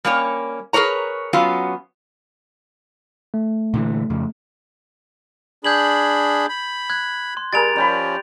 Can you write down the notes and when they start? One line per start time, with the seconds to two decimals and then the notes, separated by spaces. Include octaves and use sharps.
0.05 G3 A#3 C#4 C#5
0.73 G#4 A#4 B4 C#5 A#5
1.33 F#3 B3 C#4 F4
3.34 A3
3.74 A#2 D3 E3
4.10 F2 C#3
5.65 D4 G#4 B5 G6 G#6 F#7
6.49 B5
6.90 F#6 G#6
7.37 C6
7.53 G3 G#4 A#4 A6 D7 F7
7.76 F3 C#4 D5 G5 B5